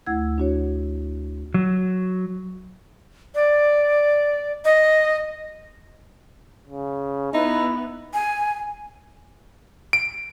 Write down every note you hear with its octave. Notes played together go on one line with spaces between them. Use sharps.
D2 A3 E4 F#5 E6 G#6
D4 F#4 C#5
F#3
D5
D#5
C#3
B3 D#4 E4
G#5
D7